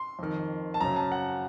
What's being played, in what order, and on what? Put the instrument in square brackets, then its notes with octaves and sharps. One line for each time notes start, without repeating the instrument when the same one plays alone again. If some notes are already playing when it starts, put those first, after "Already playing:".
Already playing: [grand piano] C6
F2 D#3
A5
F#2 C#3 A#5
A5
F#5